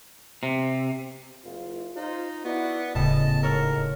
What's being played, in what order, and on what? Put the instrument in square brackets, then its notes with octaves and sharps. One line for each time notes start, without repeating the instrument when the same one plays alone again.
[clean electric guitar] C3
[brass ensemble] F#1 F4
[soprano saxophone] D#4 [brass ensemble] F4 C5
[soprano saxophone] B3 [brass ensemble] E4 F#4 D5
[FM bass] D#1 [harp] A2 C#3 [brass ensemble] B3 D#5 [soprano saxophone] A5
[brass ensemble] G#2 [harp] A4 C#5 F6 [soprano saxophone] A#4